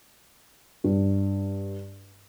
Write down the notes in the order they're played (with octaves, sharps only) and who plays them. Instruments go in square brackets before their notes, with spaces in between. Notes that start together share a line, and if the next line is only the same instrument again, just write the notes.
[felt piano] G2